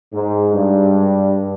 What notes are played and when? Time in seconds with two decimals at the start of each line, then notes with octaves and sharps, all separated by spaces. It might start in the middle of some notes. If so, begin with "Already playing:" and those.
0.13 G#2
0.52 G2